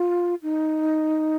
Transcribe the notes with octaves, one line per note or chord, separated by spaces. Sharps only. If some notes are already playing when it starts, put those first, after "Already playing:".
Already playing: F4
D#4